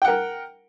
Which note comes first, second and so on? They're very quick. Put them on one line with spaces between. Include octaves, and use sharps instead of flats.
G5 F#5 A#4